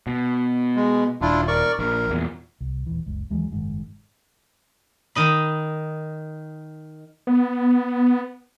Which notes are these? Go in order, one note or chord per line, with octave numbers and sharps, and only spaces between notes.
B2
G#3
D#1 D4 E4 F4
A#4 D5 C#6
A#1 A#4
E2 A#2
C2
D#1 E3
F#1 C#2
D#2 E3 F#3 G#3
F#1 G#2 D#3
D#3 D#5 B5
B3